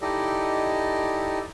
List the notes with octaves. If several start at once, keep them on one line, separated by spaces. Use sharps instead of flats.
D#4 E4 G4 A4 D5 D#5